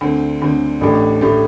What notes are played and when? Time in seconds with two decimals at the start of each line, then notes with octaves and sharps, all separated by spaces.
0.01 D2 D3 C4
0.42 D2 D3 C4
0.81 A1 A2 A3 D4 G4
1.21 A2 A3 D4 G4